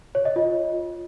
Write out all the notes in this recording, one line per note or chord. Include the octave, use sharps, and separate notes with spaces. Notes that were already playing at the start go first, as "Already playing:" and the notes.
C#5
D#5
F4